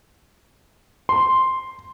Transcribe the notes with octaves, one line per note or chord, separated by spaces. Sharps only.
C6